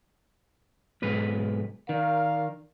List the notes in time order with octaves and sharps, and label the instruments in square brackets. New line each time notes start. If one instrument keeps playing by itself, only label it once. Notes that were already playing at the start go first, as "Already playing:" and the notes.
[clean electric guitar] B1 G#2 B4
[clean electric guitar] D#3 [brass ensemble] A#4 D5 F5